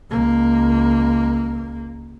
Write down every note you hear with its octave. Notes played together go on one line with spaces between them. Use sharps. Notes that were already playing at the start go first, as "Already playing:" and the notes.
C#2 A#3